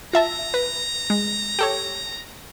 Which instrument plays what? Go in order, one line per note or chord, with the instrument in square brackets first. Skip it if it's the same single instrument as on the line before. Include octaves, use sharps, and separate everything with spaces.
[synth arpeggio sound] F4 E5 A5 [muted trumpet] A#5
[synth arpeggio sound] B4
G#3
G4 A4 C#5